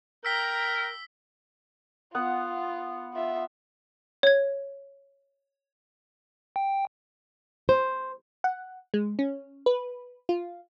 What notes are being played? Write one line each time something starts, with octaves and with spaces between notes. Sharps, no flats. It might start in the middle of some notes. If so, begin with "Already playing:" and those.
A#4 G5 A#5 E6 B6 G7
B3 F4 F#5
F4 E5
C#5 G#6
G5
C5
F#5
G#3
C#4
B4
F4